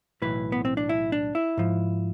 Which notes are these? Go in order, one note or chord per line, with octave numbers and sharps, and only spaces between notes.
B1 A2 E3 B4
B3
C4
D4
E4
D4
E4
G#2 F3